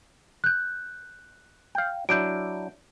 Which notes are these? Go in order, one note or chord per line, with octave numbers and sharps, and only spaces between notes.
F#6 G6
F5 G5
F#3 D4 E4 G6 D7